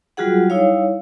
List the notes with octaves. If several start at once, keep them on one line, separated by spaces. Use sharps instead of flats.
F#3 G3 F4 F#4 G#4 F#5
G3 D#4 E4 C#5 F5